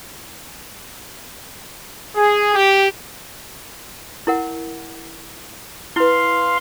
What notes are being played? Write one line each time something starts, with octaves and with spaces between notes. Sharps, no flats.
G#4
G4
E4 A#4 F#5
E4 B4 F5 C6